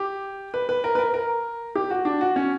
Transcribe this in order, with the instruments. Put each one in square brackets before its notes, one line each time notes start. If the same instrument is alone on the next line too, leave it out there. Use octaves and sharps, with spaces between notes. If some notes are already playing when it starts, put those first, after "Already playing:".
Already playing: [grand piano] G4
B4
B4
A#4
B4
A#4
A#4
G4
F#4
D4
F#4
C#4